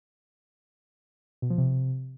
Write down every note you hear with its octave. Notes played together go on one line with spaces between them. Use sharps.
B2
F3
C3